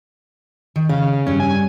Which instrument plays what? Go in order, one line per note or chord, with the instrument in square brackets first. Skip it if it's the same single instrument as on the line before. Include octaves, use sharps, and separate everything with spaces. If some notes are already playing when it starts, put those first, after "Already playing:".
[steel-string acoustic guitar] D#3
[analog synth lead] C#3 [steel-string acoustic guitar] F5
[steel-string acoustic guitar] G2 F#3 [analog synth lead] C#4
[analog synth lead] G#5